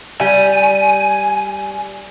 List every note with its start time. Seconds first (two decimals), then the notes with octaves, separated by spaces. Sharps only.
0.21 G3 G#5